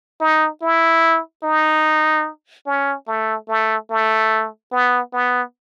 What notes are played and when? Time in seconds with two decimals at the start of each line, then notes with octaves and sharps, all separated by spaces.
0.21 D#4
0.62 E4
1.43 D#4
2.66 C#4
3.07 A3
3.49 A3
3.90 A3
4.72 B3
5.13 B3